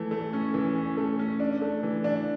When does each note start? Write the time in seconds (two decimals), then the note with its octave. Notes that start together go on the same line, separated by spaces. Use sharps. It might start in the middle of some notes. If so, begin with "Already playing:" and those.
Already playing: E3 A3
0.11 A3
0.33 C#4
0.54 E3
0.76 C#4
0.97 A3
1.19 C#4
1.40 D4
1.62 A3
1.83 E3
2.04 D4